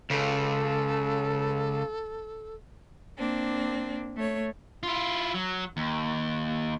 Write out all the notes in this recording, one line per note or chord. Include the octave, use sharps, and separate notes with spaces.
C#2 C#3 A4
A#3 C4 D4
A3 C#5
E4 F4
F#3
D#2